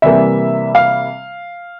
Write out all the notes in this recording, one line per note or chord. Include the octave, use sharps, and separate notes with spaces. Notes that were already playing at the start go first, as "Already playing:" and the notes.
C3 E3 G3 A#3 E5
F5